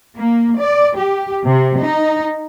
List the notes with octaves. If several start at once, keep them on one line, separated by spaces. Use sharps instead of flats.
A#3
D5
G4
C3
D#4